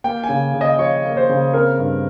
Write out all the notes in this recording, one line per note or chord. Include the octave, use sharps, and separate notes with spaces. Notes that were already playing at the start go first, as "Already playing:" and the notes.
A#3 G5
G#5
C#3
C#3
D#5
F3 C#5
A#3
C5
C#3
C4 A#4
G2